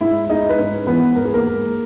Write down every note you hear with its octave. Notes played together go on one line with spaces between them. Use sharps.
G#2 E4 E5
G#3 D#4 D#5
B4
G#2 C#4 C#5
E3 B3 B4
G#2 A#4
G#4
A#3 A#4
G#3